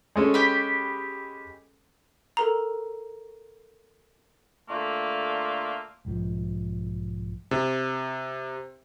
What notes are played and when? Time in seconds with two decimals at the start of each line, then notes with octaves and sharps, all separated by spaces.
0.16 G#3 C#4 A4
0.34 G4 B5
2.37 A4 A#4 A#5
4.70 D3 A3 A#3 F4
6.05 B1 G#2 F3
7.51 C3